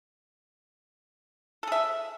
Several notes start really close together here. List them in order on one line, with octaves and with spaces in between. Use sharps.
A4 G#4 E5